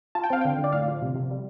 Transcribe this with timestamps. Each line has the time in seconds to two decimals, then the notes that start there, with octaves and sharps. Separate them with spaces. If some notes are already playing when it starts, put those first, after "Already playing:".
0.15 F4 A5
0.24 G5
0.30 C4 F5
0.41 D3 G5
0.58 D3
0.64 D5
0.73 A2 F5
0.88 F3
1.02 C3
1.15 C3
1.31 G3